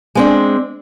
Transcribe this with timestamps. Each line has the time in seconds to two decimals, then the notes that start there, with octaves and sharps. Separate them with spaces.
0.15 G#3 C4 D4